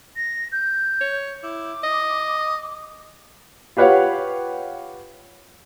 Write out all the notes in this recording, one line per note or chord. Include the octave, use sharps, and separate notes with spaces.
A#6
G6
C#5
E4 D6
D#5
F4 G4 B4 C#5 F5 F#5